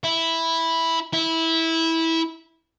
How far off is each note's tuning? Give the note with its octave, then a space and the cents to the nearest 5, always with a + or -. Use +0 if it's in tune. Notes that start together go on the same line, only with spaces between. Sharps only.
E4 -5
E4 -15